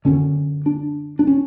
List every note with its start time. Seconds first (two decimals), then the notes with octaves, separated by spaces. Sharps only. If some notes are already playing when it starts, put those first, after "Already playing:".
0.05 F#2 D3 C#4
0.66 D4
1.19 D4
1.27 C#4